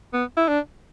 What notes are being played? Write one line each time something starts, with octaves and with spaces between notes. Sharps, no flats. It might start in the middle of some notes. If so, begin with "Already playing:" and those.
B3
E4
D4